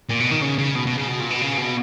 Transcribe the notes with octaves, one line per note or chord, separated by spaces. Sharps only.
A#2
B2
D#3
C#3
C#3
B2
B2
C#3
B2
A#2
B2
C#3
B2